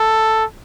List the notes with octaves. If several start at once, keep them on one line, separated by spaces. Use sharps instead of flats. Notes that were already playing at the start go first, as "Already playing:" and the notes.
Already playing: A4